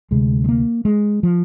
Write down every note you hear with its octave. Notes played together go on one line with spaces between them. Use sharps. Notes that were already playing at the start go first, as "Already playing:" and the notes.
D2 C3 G#3
G#3
A#3
G#3
F3